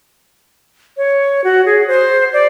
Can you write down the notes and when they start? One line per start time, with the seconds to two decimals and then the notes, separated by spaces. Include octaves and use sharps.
0.97 C#5
1.44 F#4
1.66 G#4
1.88 C5
2.33 D5